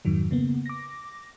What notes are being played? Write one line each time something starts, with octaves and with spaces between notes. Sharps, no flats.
F2 G#2 D#3 F#3
C#3 A#3 B3
D6 A#6